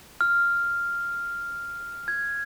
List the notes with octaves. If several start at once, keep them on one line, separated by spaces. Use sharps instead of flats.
F6
G#6